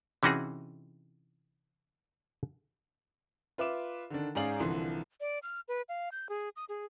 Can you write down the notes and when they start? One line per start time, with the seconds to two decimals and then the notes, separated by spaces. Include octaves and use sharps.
0.23 C3 E3 C#4 D#4 F#4 G#4
3.58 F4 B4 E5 D6 E7
4.10 D3 D#3 D4
4.35 G#2 C#4 G#4 D5 F5 F#7
4.60 C2 D3 E3 F3 C6
5.21 D5
5.43 F6
5.68 B4
5.89 F5
6.12 G6
6.29 G#4
6.56 D#6
6.69 G#4